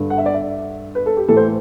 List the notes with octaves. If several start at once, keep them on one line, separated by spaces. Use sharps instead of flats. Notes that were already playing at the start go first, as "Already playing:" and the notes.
Already playing: G2 D3
F#5
E5
D5
E5
B4
A4
G4
A2 E3 A4
C5